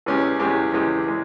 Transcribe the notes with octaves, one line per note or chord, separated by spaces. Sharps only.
E2 E3 G#3 C#4 G4
E2 E3 G#3 C#4 G4
E2 E3 G#3 C#4 G4
E3 G#3